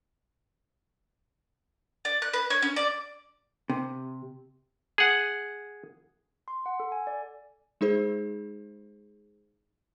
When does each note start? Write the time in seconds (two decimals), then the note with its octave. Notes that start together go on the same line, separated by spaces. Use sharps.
2.05 D5
2.22 F#6
2.33 B4
2.50 C#5
2.62 C#4
2.76 D5
3.70 C3
4.98 G#4 F#5
6.48 C6
6.66 F#5
6.80 A4
6.92 G#5
7.07 D5
7.81 G#3 D#4 G#4 C5